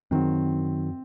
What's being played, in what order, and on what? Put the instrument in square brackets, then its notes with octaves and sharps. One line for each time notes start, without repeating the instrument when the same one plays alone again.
[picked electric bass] F#2 D#3 F#3 [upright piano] C4